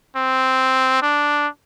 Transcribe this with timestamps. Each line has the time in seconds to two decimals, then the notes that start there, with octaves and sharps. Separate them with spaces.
0.16 C4
1.02 D4